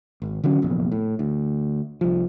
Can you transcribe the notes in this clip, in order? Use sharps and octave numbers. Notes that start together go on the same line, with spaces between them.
G#1
D3 E3 F#3 C#4
F1 A#1 E2
A2
D2
C2 F3